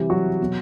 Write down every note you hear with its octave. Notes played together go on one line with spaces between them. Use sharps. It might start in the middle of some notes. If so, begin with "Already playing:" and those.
Already playing: C3 E3 G3 G4
F#3 F#4
B2 F#3